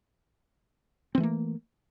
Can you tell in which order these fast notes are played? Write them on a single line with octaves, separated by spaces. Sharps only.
C4 E3 A3 A#3